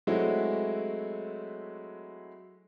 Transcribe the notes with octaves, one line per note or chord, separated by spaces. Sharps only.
F#3 G#3 A3 C4 E4 F#4